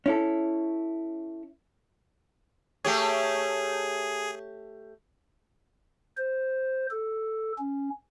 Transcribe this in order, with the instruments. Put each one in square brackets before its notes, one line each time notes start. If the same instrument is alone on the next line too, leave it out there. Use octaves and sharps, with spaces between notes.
[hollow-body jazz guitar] C#4 E4 A4
[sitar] A3 G4 C#5 [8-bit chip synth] G#4
[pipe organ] C5
A4
C#4